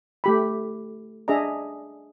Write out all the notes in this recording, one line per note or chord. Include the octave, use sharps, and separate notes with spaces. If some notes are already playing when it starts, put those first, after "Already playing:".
A3 G4 B5
D4 G#4 D#5 E5 A#5